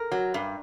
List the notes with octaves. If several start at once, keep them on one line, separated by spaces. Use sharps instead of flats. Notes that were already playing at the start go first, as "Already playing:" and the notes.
Already playing: A#4
F#3
G2